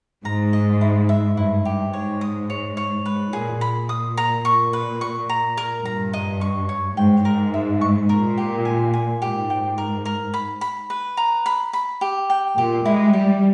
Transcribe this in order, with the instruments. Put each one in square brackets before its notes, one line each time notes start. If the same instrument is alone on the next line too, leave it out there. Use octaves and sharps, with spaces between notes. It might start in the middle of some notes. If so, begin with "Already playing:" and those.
[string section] G#2 [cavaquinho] A#5
[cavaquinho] D#5
E4
E5
[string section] G2 [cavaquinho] E4
[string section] G2 [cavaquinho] G4
[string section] G#2 [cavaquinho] C#5
[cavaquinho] D#6
C#5
C#5
[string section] G#2 [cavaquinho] B4
[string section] A#2 [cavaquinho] G#4
[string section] A#2 [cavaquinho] B5
[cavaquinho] D#6
A#5
C#6
B4
C#6
A#5
A#4
[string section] G2 [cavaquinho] A#5
[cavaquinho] D#5
C#6
C#5
[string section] G#2 [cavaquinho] G5
[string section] G#2 [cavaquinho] A#4
[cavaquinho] E5
C#6
[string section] A#2 [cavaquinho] A#4
[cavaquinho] G4
G#5
G#5
[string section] G#2 [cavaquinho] G4
[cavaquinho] G5
A#4
A#4
B5
B5
B4
A#5
B5
B5
G4
G5
[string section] A#2 [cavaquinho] G4
[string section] G#3 [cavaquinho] E4
[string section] G3 [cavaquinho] G4